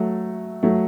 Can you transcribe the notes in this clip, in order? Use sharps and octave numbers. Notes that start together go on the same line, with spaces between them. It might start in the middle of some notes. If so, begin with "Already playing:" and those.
Already playing: F#3 A3
F#3 A3